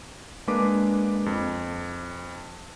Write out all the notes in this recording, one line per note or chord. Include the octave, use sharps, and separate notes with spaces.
G#3 A#3 D4 B4 D6 B6
F2